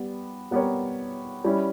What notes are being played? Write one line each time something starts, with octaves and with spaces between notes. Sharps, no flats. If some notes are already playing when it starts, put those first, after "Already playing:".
Already playing: G3 B3 G4
G3 B3 G4 A#4 C#5
G3 C#4 E4